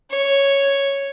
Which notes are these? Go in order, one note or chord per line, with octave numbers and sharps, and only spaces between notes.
C#5